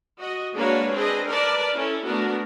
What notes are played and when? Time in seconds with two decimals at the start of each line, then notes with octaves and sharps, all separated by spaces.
0.19 F#4 D#5
0.55 G#3 A#3 D4 F#4 B4 C#5
0.92 C4 D4 G#4 B4 D#5
1.26 A#4 B4 D5 A5
1.75 C#4 E4 A4
2.06 A3 B3 D4 F#4 A#4